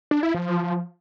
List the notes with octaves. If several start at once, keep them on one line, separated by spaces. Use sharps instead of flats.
D4
E4
F3